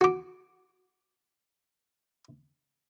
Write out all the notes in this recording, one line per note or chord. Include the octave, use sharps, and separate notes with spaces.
F#4 D6